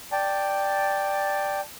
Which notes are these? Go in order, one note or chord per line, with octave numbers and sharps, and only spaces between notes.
D5 G5 A5